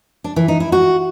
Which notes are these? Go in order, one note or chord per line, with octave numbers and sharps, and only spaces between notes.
D4
E3
D#4
E4
F#4